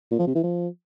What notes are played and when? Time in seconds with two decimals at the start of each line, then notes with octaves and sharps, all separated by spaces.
0.11 A#2
0.19 F3
0.27 C3
0.35 E3
0.43 F3